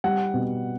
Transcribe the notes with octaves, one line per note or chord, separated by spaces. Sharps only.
G3 F#5
B2